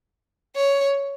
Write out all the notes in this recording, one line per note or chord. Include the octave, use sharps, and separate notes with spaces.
C#5